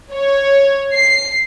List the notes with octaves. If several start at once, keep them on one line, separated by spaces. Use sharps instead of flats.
C#5
C7